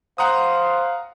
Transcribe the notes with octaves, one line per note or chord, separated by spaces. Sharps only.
C5 F5 F#5 A#5 D#6